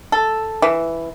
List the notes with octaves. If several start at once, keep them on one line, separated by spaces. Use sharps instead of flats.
A4
E3